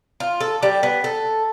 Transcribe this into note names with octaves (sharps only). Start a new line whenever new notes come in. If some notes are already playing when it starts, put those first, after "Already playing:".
F4
A4
G3
B3
A4